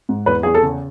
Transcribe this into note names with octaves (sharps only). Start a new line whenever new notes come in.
G#2
E2 B4
E2 G#4
A4
C#3